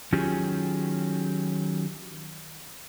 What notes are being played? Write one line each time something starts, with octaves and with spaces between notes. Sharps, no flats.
D#3 F#3 C#4 F4 G4 G#4